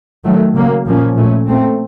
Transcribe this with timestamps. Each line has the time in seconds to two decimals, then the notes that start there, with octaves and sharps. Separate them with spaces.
0.23 D#3 F#3 A3
0.55 C#3 F#3 A#3
0.86 A#2 F3 A#3 C#4
1.16 A#2 A3 C#4
1.47 A#2 A3 C4